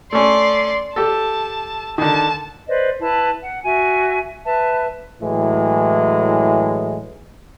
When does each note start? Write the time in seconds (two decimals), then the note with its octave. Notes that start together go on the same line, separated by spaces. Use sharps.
0.12 A3 C#4 D5 C6
0.96 G4 A4 A5
1.98 D3 D#3 A5
2.67 B4 C5 D5 D#5
3.01 E4 B4 A5
3.41 F#5
3.64 F#4 E5 G#5
4.44 B4 E5 A5
5.21 A2 E3 F#3 G#3